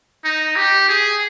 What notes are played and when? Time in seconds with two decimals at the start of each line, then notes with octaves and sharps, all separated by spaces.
0.24 D#4
0.56 G4
0.89 G#4